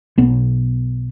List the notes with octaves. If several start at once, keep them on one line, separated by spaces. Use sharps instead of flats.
B1 B3